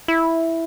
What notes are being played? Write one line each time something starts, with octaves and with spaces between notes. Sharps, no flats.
E4